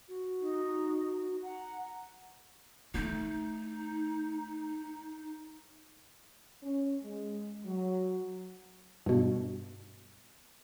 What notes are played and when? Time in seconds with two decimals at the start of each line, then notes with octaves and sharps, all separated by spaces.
0.08 F#4
0.41 D#4
1.43 F#5 A#5
2.94 A3 D#4
6.63 C#4
7.03 G#3
7.66 F#3
9.06 G2 B2